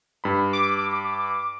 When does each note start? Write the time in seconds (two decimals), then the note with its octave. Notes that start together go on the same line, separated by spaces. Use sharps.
0.24 G2 B5
0.53 D6